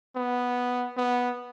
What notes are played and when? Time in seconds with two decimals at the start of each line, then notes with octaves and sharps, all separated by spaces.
0.16 B3
0.97 B3